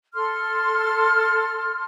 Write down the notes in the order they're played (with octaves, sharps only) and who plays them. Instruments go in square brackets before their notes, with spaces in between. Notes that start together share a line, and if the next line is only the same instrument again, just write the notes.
[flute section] A4 C6 F6